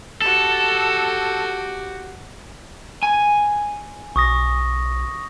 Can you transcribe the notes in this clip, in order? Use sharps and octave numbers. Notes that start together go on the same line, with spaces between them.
F#4 G4 A4
G#5
B1 C#6 D#6 A#6